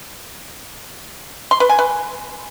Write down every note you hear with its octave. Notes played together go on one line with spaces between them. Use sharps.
C6
B4
G#5
B4